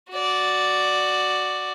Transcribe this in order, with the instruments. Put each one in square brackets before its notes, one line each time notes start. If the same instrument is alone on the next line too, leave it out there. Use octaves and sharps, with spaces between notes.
[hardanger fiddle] F#4 D5